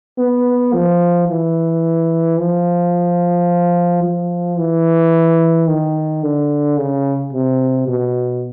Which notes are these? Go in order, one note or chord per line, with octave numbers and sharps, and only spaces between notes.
B3
F3
E3
F3
F3
E3
D#3
D3
C#3
C3
B2